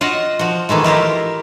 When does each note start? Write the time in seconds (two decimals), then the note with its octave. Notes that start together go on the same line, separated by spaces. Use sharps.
0.01 F4 F#4 D#5 F#5
0.39 F3 F#4
0.69 D#3 E3 G#3 A3
0.84 E4 F4 G4 A#4